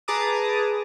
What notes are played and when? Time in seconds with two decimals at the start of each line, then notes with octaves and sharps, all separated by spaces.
0.08 G#4 B4 A5 A#5 D6 D#6